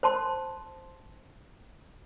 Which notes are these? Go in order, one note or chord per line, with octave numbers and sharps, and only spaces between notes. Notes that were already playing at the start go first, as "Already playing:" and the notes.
C5 A5 C6